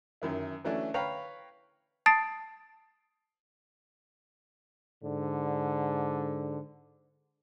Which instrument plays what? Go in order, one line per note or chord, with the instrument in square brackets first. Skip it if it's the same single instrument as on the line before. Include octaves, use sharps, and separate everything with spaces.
[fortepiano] F#2 D#3 E4
E3 F#3 A3 C#4 D4 E4
B4 C#5 F5 G5 A#5 B5
[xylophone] A5 D#6 A6 C7 D7
[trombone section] G#2 D3